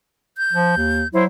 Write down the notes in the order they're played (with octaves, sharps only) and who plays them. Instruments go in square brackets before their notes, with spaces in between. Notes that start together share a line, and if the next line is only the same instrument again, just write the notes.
[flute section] G6
[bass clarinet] F3
D#2
[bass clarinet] F#3 [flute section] E4 C5